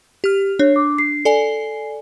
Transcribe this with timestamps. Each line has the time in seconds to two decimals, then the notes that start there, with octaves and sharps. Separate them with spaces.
0.24 G4 F6
0.59 D4 C#5
0.76 D6
0.98 C7
1.25 A4 D5 G#5